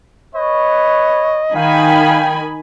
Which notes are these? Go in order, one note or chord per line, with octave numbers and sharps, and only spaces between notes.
B4 C#5 D#5 C#6
D#3 F5 G5 G#5 B5